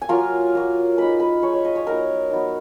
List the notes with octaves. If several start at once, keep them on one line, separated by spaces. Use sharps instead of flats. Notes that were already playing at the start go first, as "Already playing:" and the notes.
G#5
F#3 A#3 F4 A#4 A#5
F#3 A#3 F4
G#3 D#4 B4 B5
B4 B5
G#3 D#4 C#5 C#6
C#5 C#6
D#5 D#6
C#5 C#6
F#3 B3 D#4 A#4 A#5
F#3 B3 D#4